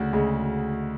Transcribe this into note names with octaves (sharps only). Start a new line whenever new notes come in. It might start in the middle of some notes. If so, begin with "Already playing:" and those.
Already playing: D2 C#3 F#4
D2 C#3 G#3